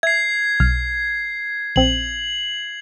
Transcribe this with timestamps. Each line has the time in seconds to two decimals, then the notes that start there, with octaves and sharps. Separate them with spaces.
0.03 E5 G#6 C7
0.60 B1 F6
1.76 A#1 C4 F#7